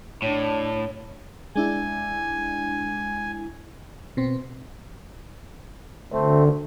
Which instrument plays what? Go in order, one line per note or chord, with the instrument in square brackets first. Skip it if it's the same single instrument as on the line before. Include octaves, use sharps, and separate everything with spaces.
[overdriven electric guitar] A2 [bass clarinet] D4 [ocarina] C#5
[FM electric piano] G#3 D4 E4 [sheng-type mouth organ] G#5
[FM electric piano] B2 C4
[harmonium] D2 [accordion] A3 C4